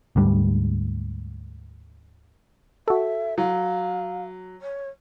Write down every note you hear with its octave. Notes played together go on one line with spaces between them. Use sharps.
D2 G#2 G3
F#4 A4 E5
F#3 F5
C#5